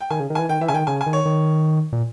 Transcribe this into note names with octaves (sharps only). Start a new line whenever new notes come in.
G5
D#3 G#5
C#3
D#3
E3 G#5
D#3 G5
E3 E5
C#3 G#5
D#3 G5
C#3 G#5
G#5
D#3
C#5
D#3
A#2